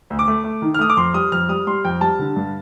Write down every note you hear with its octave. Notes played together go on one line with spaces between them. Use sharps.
D2
D6
A3
A3
D#3
F6
A3 D#6
D6
F2 C6
G3 D#6
F2 F6
G3 D#6
G3 C6
F2 G5
G3 A5
D3
G2